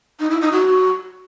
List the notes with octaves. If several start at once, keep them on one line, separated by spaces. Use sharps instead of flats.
D#4
E4
D#4
F#4